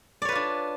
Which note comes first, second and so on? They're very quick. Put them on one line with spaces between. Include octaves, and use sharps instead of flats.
D5 C#5 B4 F4 D4